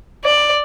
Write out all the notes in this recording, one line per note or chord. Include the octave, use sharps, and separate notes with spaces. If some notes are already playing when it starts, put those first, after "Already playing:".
D5